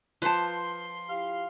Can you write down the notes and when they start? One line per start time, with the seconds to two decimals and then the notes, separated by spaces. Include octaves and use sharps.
0.22 F3 B4 C5 A5 C6
1.09 E4 G4 F5